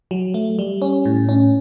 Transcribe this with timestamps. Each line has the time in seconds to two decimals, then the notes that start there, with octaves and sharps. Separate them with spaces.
0.11 F#3
0.34 A3
0.59 G3
0.82 C#4
1.05 A2
1.29 C#4